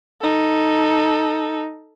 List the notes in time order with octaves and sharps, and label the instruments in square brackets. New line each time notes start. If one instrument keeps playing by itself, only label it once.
[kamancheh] D#4 A4